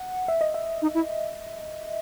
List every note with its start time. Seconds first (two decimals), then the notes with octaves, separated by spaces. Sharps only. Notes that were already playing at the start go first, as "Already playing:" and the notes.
Already playing: F#5
0.28 E5
0.41 D#5
0.54 E5
0.82 D#4
0.94 E4